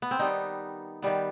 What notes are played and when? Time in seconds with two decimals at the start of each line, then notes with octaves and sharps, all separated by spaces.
0.02 B3
0.11 C4
0.19 D#3 G3 B3 D#4
1.02 D#3 G3 B3